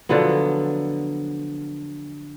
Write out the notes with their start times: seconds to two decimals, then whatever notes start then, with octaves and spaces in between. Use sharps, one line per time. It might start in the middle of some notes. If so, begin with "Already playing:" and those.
0.09 D3 F3 F#3 B3